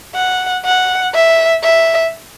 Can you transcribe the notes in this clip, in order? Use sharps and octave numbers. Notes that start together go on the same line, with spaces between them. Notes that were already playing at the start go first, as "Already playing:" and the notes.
F#5
F#5
E5
E5